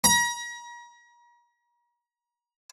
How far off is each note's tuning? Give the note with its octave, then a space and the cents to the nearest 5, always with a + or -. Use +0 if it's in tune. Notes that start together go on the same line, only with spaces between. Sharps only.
A#5 +40